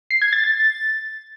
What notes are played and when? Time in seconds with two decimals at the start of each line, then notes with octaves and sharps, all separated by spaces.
0.11 C7
0.22 G#6
0.33 A6
0.44 A6